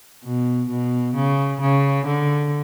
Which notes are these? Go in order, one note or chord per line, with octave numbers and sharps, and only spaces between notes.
B2
B2
C#3
C#3
D3